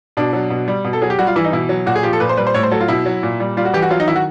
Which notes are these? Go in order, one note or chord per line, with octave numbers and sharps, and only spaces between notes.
B2 D4
F#3
B2
G3
B2
A4
F#3 G#4
G4
G3 F#4
F4
E3 E4
D#4
B2 E4
F#3
A#2 F#4
G#4
F3 G4
A4
A#2 B4
C5
G3 B4
C5
A2 C#5
C5
F#3 A4
F4
B2 E4
F#3
A#2
G3
G3 F4
F#4
E3 G4
F#4
F#3 F4
D#4
D#3 E4
F#4